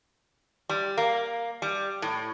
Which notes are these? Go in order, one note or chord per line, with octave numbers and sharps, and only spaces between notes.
G3
A#3
G3
A2